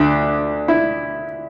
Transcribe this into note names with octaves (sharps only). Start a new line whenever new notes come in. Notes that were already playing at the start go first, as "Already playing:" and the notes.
Already playing: D2 D4
E4